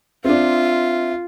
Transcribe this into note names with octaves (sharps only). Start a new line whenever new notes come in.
C4 D4 F4 E5